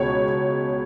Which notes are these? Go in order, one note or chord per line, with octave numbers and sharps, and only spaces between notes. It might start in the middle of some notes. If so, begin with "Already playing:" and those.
Already playing: C#2 B2 C#5